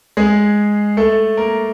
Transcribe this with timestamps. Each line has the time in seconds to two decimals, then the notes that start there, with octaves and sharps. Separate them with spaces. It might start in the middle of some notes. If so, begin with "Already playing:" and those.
0.17 G#3 G#4
0.97 A3 A4
1.37 A#3 A#4